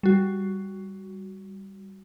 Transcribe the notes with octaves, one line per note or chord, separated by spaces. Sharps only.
G3 F#4